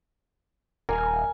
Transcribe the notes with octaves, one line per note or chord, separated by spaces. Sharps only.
D#1 A#4 G#5